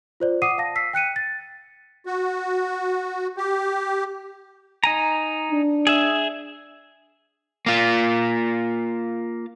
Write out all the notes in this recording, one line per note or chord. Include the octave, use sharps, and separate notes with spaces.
F4 C5 D5
F#5 D6 D#6 C7 D#7
F5 A5 A#6
E6 B6 C7
G5 F#6 C#7 D#7
A6
F#4
G4
D#4 G#5 A#5
D4
G#4 E5
A#3 F4